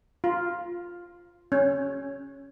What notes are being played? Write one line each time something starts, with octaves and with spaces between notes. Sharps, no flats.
F4
C#4